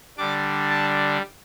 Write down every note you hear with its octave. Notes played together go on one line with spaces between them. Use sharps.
D3 G3 D4 D6
A5